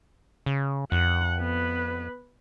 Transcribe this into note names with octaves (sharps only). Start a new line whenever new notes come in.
C#3
F2 F#5
B3 B4